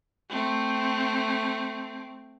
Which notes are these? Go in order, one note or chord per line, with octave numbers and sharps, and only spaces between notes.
A3 C4